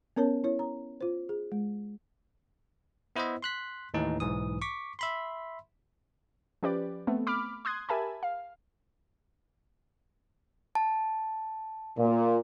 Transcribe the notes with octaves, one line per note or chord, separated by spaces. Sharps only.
B3 C#4 A#4 C#5 A5
E4 C#5
A#5
F4 C5
G#4
G#3
B3 E4 B4 C5 D#5 E5
C6 F#6 B6
D#2 A2 E3 D#4
B1 G#2 E3 D#6
C#6 D6 B6
E5 B5 C6
F3 C#4 G4 B4 D5
A3 B3 C4
B5 D6 F6
C6 D#6 F#6 G#6
G4 A#4 E5 G#5 A5 B5
F5
A5
A#2